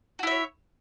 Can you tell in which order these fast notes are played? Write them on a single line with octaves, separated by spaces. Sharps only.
F#4 E4 E5 C#5